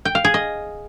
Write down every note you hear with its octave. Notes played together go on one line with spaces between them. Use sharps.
G5
F5
G#4
D#5